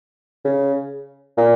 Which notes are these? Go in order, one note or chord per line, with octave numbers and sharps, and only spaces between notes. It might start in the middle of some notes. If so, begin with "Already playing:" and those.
C#3
A#2